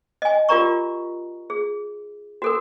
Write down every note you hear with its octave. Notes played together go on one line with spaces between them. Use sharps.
D#5 G#5
F4 G4 A#4 D5 A#5 C#6
G#4
F#4 A4 A#4